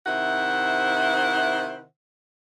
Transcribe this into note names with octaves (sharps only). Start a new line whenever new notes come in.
C3 D#3 E4 C5 E5 F#5